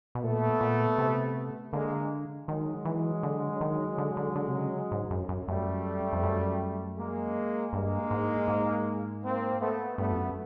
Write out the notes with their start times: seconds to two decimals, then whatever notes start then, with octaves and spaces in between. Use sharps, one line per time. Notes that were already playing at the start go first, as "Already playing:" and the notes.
0.15 B2
0.23 A#2 A3 B3
0.61 A#2
0.98 C3
1.73 D3 G#3 A#3
2.48 D#3 F#3 G#3
2.85 E3
3.23 D3
3.61 D#3
3.98 D3
4.17 D3
4.35 D3
4.48 C3
4.54 C#3
4.92 G#2
5.11 F#2
5.29 F#2
5.48 F#2 G3 A3
6.13 F2
6.23 F#2
6.98 G#3 A#3
7.73 G2 G#3 A#3
8.11 G#2
8.48 G#2
9.23 A#3 C4
9.60 A3 B3
9.98 G2 A3 B3
10.12 F2
10.17 F#2